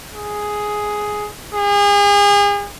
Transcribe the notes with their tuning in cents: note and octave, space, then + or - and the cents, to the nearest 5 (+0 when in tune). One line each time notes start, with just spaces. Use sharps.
G#4 +5
G#4 -35